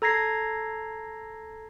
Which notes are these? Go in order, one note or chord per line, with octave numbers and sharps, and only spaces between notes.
A4 A#5 G#6 A#6 C7